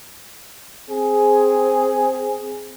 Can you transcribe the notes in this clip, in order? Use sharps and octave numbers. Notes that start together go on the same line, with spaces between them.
C4 G#4